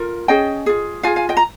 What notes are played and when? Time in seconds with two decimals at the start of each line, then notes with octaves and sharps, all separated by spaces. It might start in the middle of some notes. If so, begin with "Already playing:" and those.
Already playing: F4 A#4
0.28 C#4 G#4 D#5 G5
0.66 F4 G#4
1.03 F4 G#4 F5 G#5
1.16 F5 G#5
1.29 D#5 G5
1.37 A#5